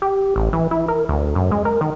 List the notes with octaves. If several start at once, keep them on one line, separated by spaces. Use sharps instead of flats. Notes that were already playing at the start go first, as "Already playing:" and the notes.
G4
A1
E3
E4
A#4
D2
F#2
G#3
A#4
D#3